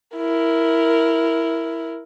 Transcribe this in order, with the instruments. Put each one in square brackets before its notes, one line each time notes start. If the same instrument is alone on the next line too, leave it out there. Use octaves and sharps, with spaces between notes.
[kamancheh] E4 A#4